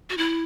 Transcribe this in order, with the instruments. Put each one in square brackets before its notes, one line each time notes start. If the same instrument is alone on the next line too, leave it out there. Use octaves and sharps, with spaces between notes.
[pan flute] F#4
E4